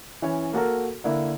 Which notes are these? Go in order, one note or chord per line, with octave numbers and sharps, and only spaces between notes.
E3 C#4 C#5
A#3 F#4 A4 A#4
D3 A#3 E4